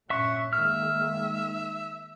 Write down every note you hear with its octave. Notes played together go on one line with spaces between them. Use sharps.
G2 A#2 C#4 E5 F#5 C#6
D#3 G#3 A#3 E5 F6